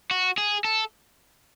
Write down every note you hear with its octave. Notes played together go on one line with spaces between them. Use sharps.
F#4
G#4
A4